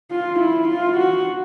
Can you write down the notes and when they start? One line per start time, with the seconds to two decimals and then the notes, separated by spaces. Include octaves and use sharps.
0.11 F4
0.39 E4
0.69 F4
0.98 F#4